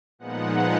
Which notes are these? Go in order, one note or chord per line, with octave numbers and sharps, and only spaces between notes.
A#2 F3 G#3 B3 D#4 F#5